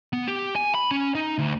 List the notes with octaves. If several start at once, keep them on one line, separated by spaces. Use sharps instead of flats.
B3
G4
G#5
B5
C#4
D#4
D2